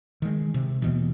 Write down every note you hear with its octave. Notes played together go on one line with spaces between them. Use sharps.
D#3 G#3
C3
D#2 B2 E3